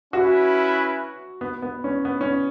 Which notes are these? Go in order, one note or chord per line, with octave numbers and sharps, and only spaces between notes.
C#4 E4 F#4 B4 E5
B3
B3
C#4
B3
C#4